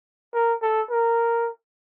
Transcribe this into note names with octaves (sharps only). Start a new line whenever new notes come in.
A#4
A4
A#4